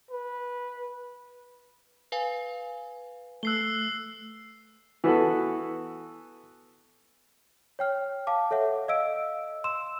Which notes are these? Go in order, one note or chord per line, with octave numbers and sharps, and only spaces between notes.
B4
B4 F5 G#5
A3 E6 F#6 C7 G7
E3 B3 F#4 A4
C#5 G5 F6
F5 A5 D6
A4 C#5 E5 F#5
D#5 F5 E6 D7
C6 E6 E7